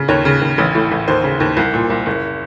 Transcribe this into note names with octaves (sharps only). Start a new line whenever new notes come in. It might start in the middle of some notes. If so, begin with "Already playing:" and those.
Already playing: C#3
D#2 C#5
C#3
D#2
A1
A2
A1
D#2 C5
C#3
D#2
C2
A#2
C2
F#1